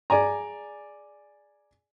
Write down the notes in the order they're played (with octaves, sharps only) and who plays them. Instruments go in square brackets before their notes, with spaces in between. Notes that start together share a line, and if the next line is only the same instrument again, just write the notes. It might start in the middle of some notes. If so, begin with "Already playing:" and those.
[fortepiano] G#4 D5 G#5 A#5